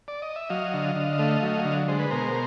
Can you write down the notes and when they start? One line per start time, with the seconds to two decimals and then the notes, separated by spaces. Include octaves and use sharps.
0.08 D5
0.22 D#5
0.36 E5
0.50 F#3 D#5 F5
0.74 D3
0.96 D3
1.19 A3
1.43 F#3
1.65 D3
1.88 G#3 C5
1.99 B4
2.10 B2 A#4 C5